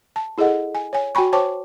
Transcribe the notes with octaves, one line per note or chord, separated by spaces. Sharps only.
A5
E4 G#4 A4 D#5 F#5
G#5
C#5 G#5
F#4 G5 G#5 B5 C#6
C5 C#5 G5 A5 C#6 D6